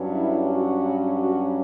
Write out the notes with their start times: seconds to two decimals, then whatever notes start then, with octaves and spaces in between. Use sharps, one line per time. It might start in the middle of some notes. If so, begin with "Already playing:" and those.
Already playing: G2 F#3 C#4
0.12 E4
0.48 F#4
1.18 F#4